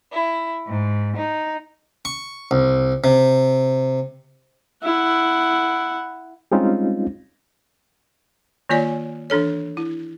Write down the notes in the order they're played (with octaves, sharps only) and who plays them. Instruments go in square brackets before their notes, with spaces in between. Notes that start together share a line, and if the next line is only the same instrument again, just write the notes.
[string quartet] E4
G#2
D#4
[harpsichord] C#6
C2
C3
[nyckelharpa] E4 F#5
[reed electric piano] G3 G#3 C4 C#4 D#4 F4
[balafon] D#3 A#3 F4 C#5 D5 G#5
E3 D4 A4 C#5
E4